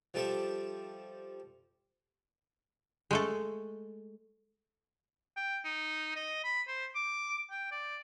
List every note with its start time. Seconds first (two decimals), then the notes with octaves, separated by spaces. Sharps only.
0.14 F3 G3 A4 E5
3.11 G#3 A3 A4
5.36 G5
5.64 D#4
6.16 D#5
6.44 B5
6.68 C5
6.95 D6
7.50 G5
7.71 D5